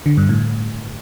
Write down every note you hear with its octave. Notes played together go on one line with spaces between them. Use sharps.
D3
G2
A2